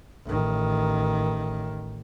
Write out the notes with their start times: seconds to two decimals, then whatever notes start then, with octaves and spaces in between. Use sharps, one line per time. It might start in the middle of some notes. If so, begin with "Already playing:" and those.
0.24 A1 D#3